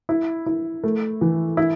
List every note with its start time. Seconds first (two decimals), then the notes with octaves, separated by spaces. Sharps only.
0.09 E4
0.46 E4
0.84 A3
1.21 E3
1.57 E4